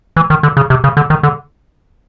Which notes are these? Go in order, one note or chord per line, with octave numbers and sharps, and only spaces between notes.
E3
D#3
D3
C#3
C3
C#3
D3
D#3
D3